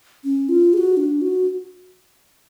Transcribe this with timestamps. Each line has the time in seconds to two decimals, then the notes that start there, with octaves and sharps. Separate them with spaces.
0.24 C#4
0.49 F4
0.73 G#4
0.78 F#4
0.97 D4
1.21 F#4